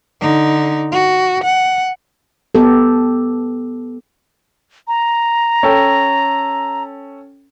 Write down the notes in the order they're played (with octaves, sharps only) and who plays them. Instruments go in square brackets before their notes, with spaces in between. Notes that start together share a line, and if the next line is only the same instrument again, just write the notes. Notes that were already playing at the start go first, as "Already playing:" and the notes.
[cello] D3 D#4
F#4
F#5
[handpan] B3 G4 A4
[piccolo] A#5
[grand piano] C#4 A4 G5